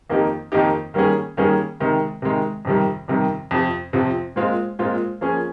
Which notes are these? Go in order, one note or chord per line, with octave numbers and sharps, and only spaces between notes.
F2 D#3 A#3 D#4 G4
F2 D#3 A#3 D#4 G4
D#3 G3 A#3 C#4 G#4
D#3 G3 A#3 C#4 G#4
C3 D#3 G#3
C3 D#3 G#3
F2 C3 D#3 G3
F2 C3 D#3 G3
F2 C3 F3
F2 C3 F3
A#2 G#3 C4 F4
A#2 G#3 C4 F4
F3 A#3 C#4 G#4